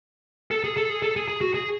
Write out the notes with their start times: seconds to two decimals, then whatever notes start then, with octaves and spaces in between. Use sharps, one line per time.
0.51 A4
0.64 G#4
0.77 A4
0.89 G#4
1.02 A4
1.16 G#4
1.28 G#4
1.41 F#4
1.54 G#4